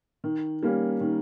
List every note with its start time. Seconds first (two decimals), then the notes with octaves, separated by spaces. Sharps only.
0.24 D#3
0.63 G3 A#3 C#4
1.01 D#3